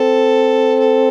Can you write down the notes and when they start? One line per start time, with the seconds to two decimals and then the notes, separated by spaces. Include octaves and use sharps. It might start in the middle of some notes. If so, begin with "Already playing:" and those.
Already playing: C4 A4
0.79 A4